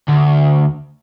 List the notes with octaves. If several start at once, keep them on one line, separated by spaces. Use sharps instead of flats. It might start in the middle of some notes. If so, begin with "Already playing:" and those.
D2